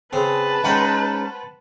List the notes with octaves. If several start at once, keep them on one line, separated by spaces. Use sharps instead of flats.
C#3 C4 B4 A5
G#3 C#4 D#4 C5 F#5 G5